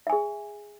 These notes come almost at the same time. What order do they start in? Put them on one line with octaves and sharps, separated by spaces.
E5 G#5 G#4